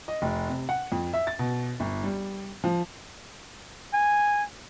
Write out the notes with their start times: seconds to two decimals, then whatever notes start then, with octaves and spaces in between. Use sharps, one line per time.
0.08 D#5
0.22 F1
0.49 C3
0.69 F#5
0.92 F2
1.14 E5
1.27 A6
1.39 B2
1.80 G1
2.04 G3
2.64 F3
3.93 G#5